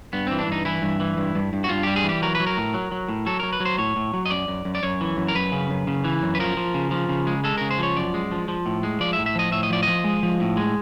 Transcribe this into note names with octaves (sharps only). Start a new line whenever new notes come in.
G2 B3
E3 C4
D4
G2 D#4
E3 E4
G2
E3
G2
G2
G2
F#4
G2 F4
G3 G4
G#4
E3
G4
F#3 A#4
B4
F#3
A#4
A2
F#3
F#3
A2
F#3 A4
F#3 A#4
B4
F#3 C5
A2 C#5
A2
F#3
D#5
F#2 D5
F#2
F#2
D5
F#2 C#5
E3
F#2
A#4
F#2 B4
C#3
F#2
C#3
E3
F#2
B4
F3 A#4
F3
C#3
F3
C#3
G#3
G#3 A4
C#3 A#4
C5
F3 C#5
F#2 D5
G#3
F3
F3
A2
G#3
F3 D5
E5
A2
E5
F3 D#5
A2 E5
D#5
F3 D5
F3 D#5
G#3
F3
A2
G#3